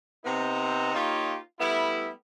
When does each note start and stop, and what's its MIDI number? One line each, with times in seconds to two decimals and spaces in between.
0.24 0.94 48
0.24 0.94 59
0.24 0.94 60
0.24 0.94 63
0.24 0.94 82
0.94 1.36 58
0.94 1.36 63
0.94 1.36 65
0.94 1.36 67
0.94 1.36 73
1.59 2.09 55
1.59 2.09 57
1.59 2.09 59
1.59 2.09 64